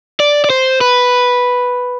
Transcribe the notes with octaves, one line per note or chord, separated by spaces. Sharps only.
D5
D5
C5
B4